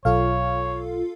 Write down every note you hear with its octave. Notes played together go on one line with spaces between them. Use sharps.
B1 F4 A4 C#5 F5